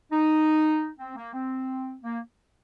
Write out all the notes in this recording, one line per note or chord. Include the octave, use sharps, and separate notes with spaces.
D#4
C4
A#3
C4
A#3